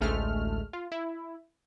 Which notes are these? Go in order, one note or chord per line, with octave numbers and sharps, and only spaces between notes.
A1 D2 G#3 A3 F6
F4
E4